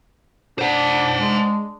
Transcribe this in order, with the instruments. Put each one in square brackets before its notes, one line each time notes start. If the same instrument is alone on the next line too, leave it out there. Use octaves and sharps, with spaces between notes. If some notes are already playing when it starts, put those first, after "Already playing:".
[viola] D4 [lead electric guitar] C5 F#5
[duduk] G#3